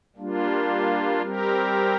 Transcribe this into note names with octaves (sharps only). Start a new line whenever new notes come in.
G3 A#3 D4 F4
G3 C4 G4 A#4